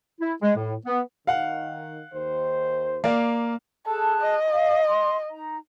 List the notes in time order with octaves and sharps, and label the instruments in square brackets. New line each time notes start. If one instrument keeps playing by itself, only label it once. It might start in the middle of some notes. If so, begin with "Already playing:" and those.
[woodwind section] E4
G#3
A2
B3
[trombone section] D#3 [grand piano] F5 F#5
[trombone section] D#2 D#3 C5
[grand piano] A#3 D5 F5
[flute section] G#4 A5 F#6 [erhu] A4
[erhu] D#5
[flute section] F5
C6
D#4 A#5